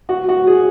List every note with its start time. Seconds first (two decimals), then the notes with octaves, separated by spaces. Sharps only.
0.09 F#4
0.29 F#4
0.47 G#4